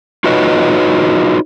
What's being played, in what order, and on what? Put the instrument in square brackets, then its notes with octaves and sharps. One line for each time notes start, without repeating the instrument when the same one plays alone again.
[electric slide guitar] D#4 F4 F#4 B4 C#5 D#5